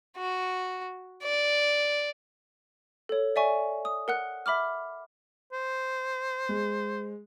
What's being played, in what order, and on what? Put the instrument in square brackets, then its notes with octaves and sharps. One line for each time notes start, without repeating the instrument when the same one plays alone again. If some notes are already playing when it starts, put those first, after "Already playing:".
[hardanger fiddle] F#4
D5
[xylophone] A4 C#5
D5 E5 G#5 C#6
D#6
A#4 F#5 F#6
E5 B5 D6 F6
[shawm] C5
[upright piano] G#3